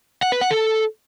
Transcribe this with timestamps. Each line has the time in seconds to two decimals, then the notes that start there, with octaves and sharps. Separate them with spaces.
0.23 F#5
0.32 B4
0.41 F#5
0.51 A4